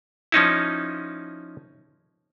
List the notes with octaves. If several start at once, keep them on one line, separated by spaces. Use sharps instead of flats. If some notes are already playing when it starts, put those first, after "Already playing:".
F3 C#4 D#4 E4